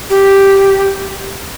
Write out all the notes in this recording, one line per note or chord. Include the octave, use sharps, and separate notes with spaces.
G4